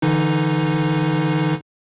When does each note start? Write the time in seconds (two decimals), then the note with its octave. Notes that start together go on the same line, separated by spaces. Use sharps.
0.02 D3 E3 D#4